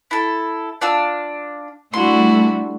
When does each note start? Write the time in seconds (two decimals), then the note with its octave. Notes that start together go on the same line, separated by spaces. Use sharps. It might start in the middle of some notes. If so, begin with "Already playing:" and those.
0.11 E4 A4
0.82 D4 F4 E6
1.94 G3 A3 D4 E4 F#4 C6